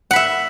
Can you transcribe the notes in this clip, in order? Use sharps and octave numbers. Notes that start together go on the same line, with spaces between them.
E5 F#5 B5